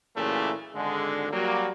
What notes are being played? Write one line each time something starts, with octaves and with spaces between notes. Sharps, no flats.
A#2 C#3 E3 F#3 A3 A#3
G#1 D3 G#3
F#3 G3 A#3